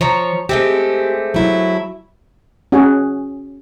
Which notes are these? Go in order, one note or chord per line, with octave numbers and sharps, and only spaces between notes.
F3 C#5 A#5
G#3 A3 C4 G4
F#3 E4
C#4 F#4 G#4 G#5